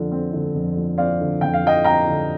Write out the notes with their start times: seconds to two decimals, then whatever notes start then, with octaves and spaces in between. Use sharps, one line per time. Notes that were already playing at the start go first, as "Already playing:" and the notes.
Already playing: F2 D3 F3 C4
0.12 C4
0.33 D3
0.55 F2
0.76 F3
0.98 C4 D5 F5
1.20 D3
1.41 F2 G5
1.54 F5
1.64 F3 D#5 G5
1.84 C4 G5 A#5
2.07 D3